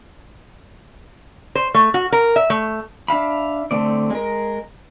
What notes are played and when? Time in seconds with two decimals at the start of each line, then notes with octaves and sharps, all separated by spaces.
1.55 C5
1.75 A3
1.94 F#4
2.12 A#4
2.36 E5
2.50 A3
3.08 D4 E5 F5 B5
3.71 D3 A3 C4 D5
4.10 G#3 A#4